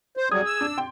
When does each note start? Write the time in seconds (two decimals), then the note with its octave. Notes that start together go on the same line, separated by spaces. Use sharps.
0.17 C5
0.31 F#3 G3 G#4 D#6 G#6
0.46 E6
0.61 D4
0.78 G5 C6